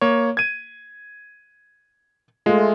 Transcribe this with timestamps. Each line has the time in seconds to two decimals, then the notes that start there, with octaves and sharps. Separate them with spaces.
0.01 A#3 C#5
0.37 G#6 D#7
2.46 G#3 A3 F4